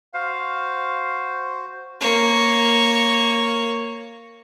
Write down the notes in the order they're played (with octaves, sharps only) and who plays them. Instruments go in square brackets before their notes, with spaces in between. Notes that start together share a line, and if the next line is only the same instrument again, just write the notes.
[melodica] F#4 C5 [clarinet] F5
[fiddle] A#3 C#5